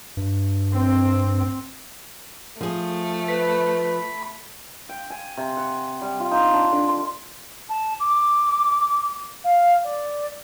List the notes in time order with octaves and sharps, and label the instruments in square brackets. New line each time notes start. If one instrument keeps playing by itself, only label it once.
[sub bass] G2
[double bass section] C4
[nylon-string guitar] F3 G#4 [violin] A3
[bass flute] B4 [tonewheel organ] B5
[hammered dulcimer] G5
G#5
C3
F#5
G3
F4
D#4
D4
D3
C6
[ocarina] A5
D6
F5
D5